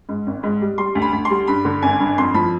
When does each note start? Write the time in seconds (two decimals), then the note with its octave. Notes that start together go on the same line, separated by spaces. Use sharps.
0.09 G#2
0.27 G#1
0.43 G#2
0.61 G3
0.78 G3 C6
0.95 D2
1.02 B5
1.13 D2
1.25 C6
1.30 G3
1.47 G2 B5
1.65 D3
1.82 G#1 G#5
2.00 G2
2.18 F2 C6
2.34 F3 B5